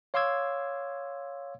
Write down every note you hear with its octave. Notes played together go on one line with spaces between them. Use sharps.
C#5 F5 C6 D6 E6 G#6